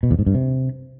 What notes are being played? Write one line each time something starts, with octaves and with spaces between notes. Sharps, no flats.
B2
E2
G#2
G2
C3